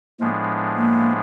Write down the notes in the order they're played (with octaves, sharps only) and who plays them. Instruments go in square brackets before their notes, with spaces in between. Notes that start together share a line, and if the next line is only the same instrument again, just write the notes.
[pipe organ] A2 F3 G#3 B3 D4 [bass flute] A#3
[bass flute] A#3